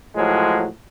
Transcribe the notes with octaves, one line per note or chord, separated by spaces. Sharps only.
A2 F3 F#3 G#3